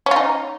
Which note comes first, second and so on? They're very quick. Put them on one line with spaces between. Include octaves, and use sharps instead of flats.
C#4 F4 D#4